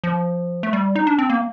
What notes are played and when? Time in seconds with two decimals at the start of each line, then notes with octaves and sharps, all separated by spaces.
0.04 F3
0.63 A3
0.73 G3
0.96 D#4
1.07 D4
1.19 C4
1.30 A#3